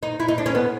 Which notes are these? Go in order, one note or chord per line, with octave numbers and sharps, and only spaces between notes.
D#4
E4
D#4
D4
C#4
B3